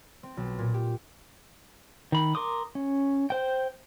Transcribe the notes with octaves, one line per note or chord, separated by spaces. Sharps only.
C4
B1
A#2
G4
D#3 B5
A#4 C6 D6 D#6
C#4
C5 G5